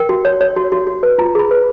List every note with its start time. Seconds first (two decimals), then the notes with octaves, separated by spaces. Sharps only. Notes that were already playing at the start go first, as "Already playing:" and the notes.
Already playing: A#4 G5
0.09 F#4
0.25 C#5
0.41 C#5
0.56 F#4
0.72 F#4
0.87 F#4
1.03 B4
1.18 F4 A#5
1.35 G#4 B5
1.51 B4